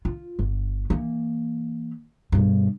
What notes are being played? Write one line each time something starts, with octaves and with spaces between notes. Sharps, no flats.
F4
G1
E3 A#3
G2 B2